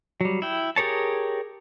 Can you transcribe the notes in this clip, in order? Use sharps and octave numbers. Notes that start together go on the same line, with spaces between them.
F#3 G3
E4 G5
G4 G#4 A#4 C#5 A5